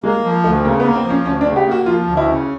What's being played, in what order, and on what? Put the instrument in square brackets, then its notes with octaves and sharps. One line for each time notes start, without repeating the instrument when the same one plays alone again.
[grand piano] G#3 [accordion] A#3
[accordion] F3
[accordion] D2 [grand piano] A3
[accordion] C#3 [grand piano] A#3
[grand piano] B3
[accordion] A#3
[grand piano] C4
[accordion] F3
[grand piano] C#4
[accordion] D2 [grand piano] C#4
[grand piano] D4
[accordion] C#3
[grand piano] G4
[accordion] A#3 [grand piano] F#4
[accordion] F3 [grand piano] F4
[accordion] D2
[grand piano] E4
[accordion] C#3